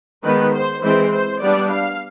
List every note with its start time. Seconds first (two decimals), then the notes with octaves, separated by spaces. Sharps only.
0.24 D#3 G#3 B3 B4
0.54 C5
0.83 E3 G#3 C4 C5
1.12 C5
1.42 G3 B3 D4 D5
1.71 F5